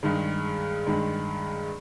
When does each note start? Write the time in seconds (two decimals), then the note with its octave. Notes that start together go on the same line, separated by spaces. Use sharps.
0.03 G2 D#3 G#3
0.87 G2 D#3 G#3